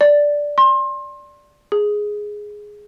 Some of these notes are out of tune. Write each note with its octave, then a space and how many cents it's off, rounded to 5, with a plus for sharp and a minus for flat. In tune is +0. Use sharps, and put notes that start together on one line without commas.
D5 -5
C6 +30
G#4 +0